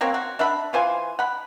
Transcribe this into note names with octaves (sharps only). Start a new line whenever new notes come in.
F#3 A#3 C4 C#5
F#4
D4 E5 F#5 B5
E3 F4 C5 G#5
F#5 B5